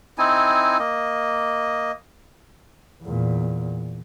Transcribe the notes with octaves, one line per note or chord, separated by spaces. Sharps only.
C4 D#4 E4 G#5
A#3 D#5
E2 A#2